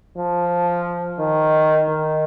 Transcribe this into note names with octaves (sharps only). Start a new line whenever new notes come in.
F3
D#3
D#3